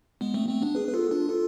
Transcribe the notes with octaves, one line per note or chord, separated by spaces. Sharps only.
G#3 B3
A3 C4
A3 C4
B3 D4
G#4 B4
B4
F4 A4
D4 F4
F4 A4